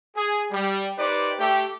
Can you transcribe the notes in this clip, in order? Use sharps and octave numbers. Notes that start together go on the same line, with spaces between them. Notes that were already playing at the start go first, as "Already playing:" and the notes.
G#4
G3
D#4 G4 B4 C5 D5
A3 G4